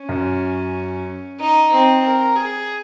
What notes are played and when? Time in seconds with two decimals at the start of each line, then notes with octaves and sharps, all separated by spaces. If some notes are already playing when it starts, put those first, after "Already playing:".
Already playing: C#4
0.09 F#2
1.40 D#4
1.71 C4
2.03 A#4
2.36 G#4